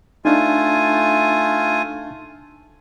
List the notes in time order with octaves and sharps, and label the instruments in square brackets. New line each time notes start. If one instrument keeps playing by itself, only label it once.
[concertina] A3 F4 G#5 [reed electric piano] D4 D#4